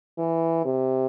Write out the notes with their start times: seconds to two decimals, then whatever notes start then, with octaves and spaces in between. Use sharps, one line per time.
0.18 E3
0.65 C3